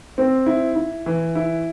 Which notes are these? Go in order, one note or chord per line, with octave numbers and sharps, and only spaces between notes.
C4
E4
E4
E3
E4